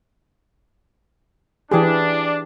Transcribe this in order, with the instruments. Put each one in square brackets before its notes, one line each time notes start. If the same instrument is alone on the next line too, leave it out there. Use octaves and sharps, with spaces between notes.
[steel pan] E3 G4 G#4 [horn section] D4